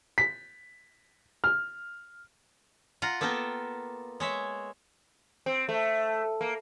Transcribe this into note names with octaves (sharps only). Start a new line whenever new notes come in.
B6
F6
F4 F#5 A#5
A#3 B3 A4 A#4 G5
G#3 C#5 E5
C4
A3
A#3